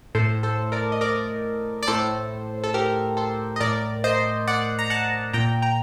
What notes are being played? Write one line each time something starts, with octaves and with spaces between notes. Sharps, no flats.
A2 A4 C5
A4 C5
A#4 D5
D#5
A#4 D5
D5
A2 A4 C5
A4
G4 A#4
A4 C5
D#5
A2 A#4 D5
C5 D#5
D5 F#5
A#5
F#5 A5
A#2 G5 A#5
G5 A#5